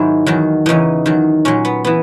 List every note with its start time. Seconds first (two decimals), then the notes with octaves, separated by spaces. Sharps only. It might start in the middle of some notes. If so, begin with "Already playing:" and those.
Already playing: G#2 D#3 F#3 E4
0.26 E2 D#3 F#3
0.66 E2 C#3 E3 D#4
1.06 E2 D#3 F#3
1.45 A#2 F#3 C#4
1.65 B3
1.84 E3 B3